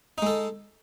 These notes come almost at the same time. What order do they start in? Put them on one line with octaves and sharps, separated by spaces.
D#4 G#3 A4